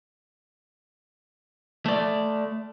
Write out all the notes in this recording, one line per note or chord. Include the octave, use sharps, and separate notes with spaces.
A3 D5